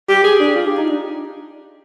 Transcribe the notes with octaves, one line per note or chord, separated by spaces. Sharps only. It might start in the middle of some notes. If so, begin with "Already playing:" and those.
G4
G#4
D4
F4
G4
D#4
D4